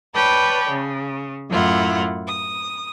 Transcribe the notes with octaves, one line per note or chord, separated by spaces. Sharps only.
B4 C#5 D5 G5 A5 B5
C#3
F#2 A2 E4 F4 F#5
D#6